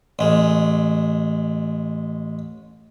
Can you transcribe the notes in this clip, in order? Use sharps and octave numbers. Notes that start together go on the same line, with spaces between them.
A1 G#3